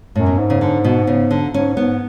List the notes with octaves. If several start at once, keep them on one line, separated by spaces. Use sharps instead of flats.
F#2 A2
B2
G#2
C#3
D3
B2
C#3
D3
G#2 C#4
G#2 B3